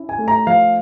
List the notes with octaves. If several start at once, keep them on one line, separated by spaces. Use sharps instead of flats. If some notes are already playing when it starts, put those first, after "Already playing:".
Already playing: C#4 E4
G#5
A3
A#5
F3 F5